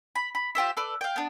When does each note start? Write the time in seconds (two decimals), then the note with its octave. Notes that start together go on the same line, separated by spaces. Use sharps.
0.15 B5
0.35 B5
0.55 F4 G4 C5 E5
0.77 A4 B4 D5
1.01 F5 G5
1.16 B3 D4